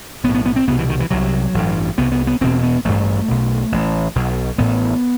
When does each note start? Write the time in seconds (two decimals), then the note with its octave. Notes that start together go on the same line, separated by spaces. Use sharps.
0.24 B1 B3
0.29 A2
0.34 B3
0.46 B3
0.56 C4
0.67 C2 B3
0.71 B2
0.78 E3
0.89 D#3
1.00 E3
1.10 C2 C3 F#3
1.54 A1 G2
1.98 C2 C3 B3
2.12 B3
2.27 B3
2.41 E1 E2 B2 C4
2.63 B3
2.85 A1 G2 A3
3.28 B1 B2
3.72 A1 A2
4.15 B1 B2
4.58 A1 A2 B3